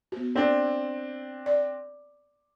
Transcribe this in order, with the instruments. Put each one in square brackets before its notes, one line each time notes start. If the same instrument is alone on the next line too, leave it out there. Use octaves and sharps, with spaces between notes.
[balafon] B3 F#4
[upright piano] C4 D4 [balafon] A4
[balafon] D5